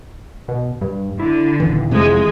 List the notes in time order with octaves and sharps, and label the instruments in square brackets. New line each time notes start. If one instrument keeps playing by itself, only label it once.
[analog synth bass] B2
G2
[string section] D3 [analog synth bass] E4
[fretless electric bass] D#1 [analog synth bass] E3
[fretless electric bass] F2 C3 [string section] G#3